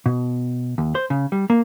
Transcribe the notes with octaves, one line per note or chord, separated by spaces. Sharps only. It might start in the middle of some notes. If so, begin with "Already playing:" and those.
B2
D#2
C5
C#3
G3
A#3